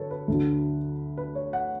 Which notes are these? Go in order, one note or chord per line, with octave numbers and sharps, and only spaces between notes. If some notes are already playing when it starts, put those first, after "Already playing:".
Already playing: D3 F#3 A4 B4 C#5
B4
D2 D3 F#3
B4
C#5
F#5